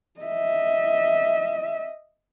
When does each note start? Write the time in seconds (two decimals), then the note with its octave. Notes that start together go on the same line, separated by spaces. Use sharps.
0.20 D#5 E5